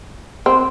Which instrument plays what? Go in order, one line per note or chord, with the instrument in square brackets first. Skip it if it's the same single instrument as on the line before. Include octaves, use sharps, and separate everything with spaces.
[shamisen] C4